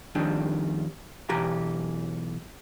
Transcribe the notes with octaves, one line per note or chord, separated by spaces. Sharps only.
F2 D#3 G3 D4
B1 E3 G4 A#5